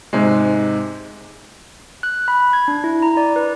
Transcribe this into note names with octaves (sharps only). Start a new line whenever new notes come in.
G#2 C3 G#3
F#6
B5
G#6
D4
E4
A#5
D5
B4